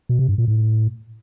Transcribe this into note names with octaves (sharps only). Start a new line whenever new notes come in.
B2
C3
G2
A#2
A2